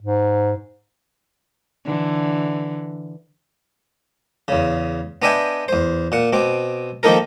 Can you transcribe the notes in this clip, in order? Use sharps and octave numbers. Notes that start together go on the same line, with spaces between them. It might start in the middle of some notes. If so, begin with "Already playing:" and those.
G#2
D3 E3
E2 C#3
B3 D4 D#5 E5 G5 G#5
E2 C5
A#2 F#5
B2 C4 D6
D#3 F3 A#3 D#4 A4 A#4